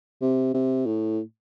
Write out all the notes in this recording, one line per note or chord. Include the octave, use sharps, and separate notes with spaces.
C3
C3
A2